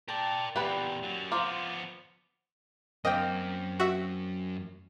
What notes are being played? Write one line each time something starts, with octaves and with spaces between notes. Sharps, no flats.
A#4 D5 G5 A5
E2 A#2 G4 B4 D5 F#5 G5
F#2 F#3
F3 B3 F4 C5 A#5 D6
F#2 A#3 C4 D#5 G5
F#4 E5